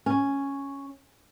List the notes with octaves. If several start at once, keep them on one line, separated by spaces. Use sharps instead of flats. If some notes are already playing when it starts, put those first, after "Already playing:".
C#4